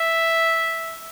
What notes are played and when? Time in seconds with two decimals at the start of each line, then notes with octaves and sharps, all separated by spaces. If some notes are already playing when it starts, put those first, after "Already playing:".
Already playing: E5